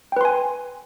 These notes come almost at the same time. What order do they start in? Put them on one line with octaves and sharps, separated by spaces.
G5 B4 C6 G#5